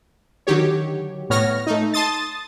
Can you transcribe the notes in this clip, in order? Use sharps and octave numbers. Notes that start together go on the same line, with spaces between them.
D3 D#3 F#3 G4 C#5
A2 B3 C#5 F6 A#6
A3 D#4
A5 C6 D#6 A6